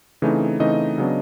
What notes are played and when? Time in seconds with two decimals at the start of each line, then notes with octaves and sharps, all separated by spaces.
0.22 C#3 E3 A3 C4 D#4
0.59 C#3 E3 A3 C4 D#4 D#5
0.98 C#3 F#3 B3 D4